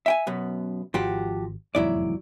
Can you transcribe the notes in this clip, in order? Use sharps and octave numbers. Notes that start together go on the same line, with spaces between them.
E5 G5 G#5
F#2 B2 B3
G#1 F3 F#4 G4
F1 E2 G#2 F#3 E4 D5